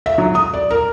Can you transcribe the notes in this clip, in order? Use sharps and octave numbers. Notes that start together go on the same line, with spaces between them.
E5
F#3
D#6
D5
A#4